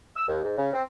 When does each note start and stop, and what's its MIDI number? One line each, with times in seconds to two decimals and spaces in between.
0.15 0.23 88
0.27 0.40 39
0.43 0.57 44
0.57 0.69 49
0.73 0.81 60